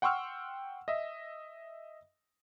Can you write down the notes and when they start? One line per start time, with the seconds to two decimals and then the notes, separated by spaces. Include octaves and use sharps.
0.02 F#5 G5 C6 C#6 E6 F6
0.88 D#5 E5